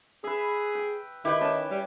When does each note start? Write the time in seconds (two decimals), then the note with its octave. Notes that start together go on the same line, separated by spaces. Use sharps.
0.24 G#4 B4 E5
0.75 G5
1.25 D#3 E4 G4 B4
1.41 C#4 A5
1.71 G3